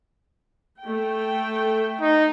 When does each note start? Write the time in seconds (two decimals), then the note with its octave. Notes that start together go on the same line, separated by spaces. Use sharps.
0.82 A3 G5
2.01 D#4